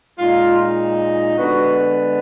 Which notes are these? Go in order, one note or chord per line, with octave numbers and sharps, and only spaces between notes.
A#2 G#3 D#4 F4
D3 G#3 B3 D4 F#4